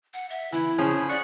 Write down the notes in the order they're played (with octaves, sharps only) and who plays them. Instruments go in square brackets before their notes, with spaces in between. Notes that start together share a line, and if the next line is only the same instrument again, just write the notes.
[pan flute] F#5
E5
[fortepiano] E3 [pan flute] E4
[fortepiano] C#3 F3 C#4 [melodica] G#4
[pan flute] D5 [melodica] F#5 C#6